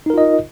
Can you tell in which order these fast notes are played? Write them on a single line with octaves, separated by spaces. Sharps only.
D#4 A#4 F4 D#5